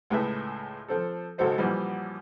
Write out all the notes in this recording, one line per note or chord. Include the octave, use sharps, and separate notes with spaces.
C#2 A2 G#4 B4 E5
F3 C4 A4
G#1 C#2 F#3 A4 C5 D#5
F#2 A#2 E3 F3 G3